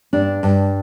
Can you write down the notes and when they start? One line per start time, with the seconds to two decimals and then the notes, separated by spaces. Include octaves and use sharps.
0.13 G2 D4
0.43 G2